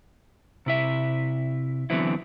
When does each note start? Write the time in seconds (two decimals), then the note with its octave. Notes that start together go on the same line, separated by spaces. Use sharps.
0.66 C3 E4 E5
1.90 D3 E3 F#3 B3 C4 E4